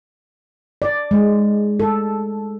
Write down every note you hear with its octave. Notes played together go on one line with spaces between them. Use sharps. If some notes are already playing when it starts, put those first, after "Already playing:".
D5
G#3
A4